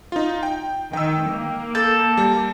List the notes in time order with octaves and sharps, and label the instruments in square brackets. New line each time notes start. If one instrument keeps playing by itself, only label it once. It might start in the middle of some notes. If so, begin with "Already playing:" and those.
[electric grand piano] D#4 F4
G5
[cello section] D#3 [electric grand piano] G5 E6
[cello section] A#3
[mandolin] A4 [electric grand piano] G6 A6
[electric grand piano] G3